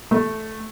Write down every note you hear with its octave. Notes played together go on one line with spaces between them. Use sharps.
A3